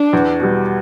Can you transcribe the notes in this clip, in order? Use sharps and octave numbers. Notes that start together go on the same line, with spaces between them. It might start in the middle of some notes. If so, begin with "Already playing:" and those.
Already playing: D4
E2
B2 G3